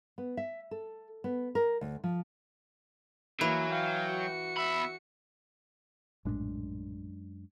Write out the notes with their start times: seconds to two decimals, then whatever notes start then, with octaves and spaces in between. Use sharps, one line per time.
0.18 B3
0.37 E5
0.71 A4
1.24 B3
1.55 A#4
1.81 D2
2.04 F3
3.41 E3 F#3 A#3
3.71 F5 G5
4.10 F#4 C#7
4.58 E2 E5 B5
6.25 A#1 F#2 A2 G#3 D4